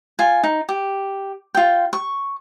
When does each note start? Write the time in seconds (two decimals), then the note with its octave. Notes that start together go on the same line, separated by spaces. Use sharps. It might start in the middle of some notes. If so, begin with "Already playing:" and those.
0.19 F4 G#5
0.44 D#4
0.69 G4
1.55 F4 G5
1.93 C#6